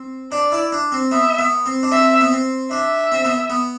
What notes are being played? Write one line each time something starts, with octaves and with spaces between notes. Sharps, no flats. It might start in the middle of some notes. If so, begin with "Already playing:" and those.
Already playing: C4
D4 D5
E4
D4
C4
B3 E5
B3
C4
D4
C4 E5
B3
C4
D4 E5
C4
B3
B3